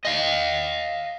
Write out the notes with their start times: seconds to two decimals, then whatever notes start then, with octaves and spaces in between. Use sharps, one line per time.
0.05 D#5 F5